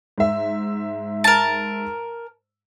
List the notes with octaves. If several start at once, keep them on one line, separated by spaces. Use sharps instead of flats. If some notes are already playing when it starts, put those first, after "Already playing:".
G#2 E5
A#4 A5